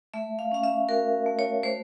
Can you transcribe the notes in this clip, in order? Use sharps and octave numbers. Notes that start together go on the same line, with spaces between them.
A3 E5
F5
C#4 F5
E5
F#4 A#4
A3
C#5
A3 C5